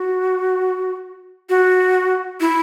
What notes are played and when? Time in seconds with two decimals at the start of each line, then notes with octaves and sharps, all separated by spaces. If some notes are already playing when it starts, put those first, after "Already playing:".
Already playing: F#4
1.49 F#4
2.40 E4